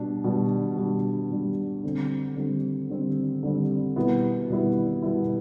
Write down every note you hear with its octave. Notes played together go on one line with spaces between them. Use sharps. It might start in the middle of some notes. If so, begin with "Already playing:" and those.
Already playing: B2 G3 D4
B2 G3 D4
B2 G3 D4
B2 G3 D4
D3 G3 C4
D3 G3 C4
D3 G3 C4
D3 G3 C4
B2 G3 B3 E4
B2 G3 B3 E4
B2 G3 B3 E4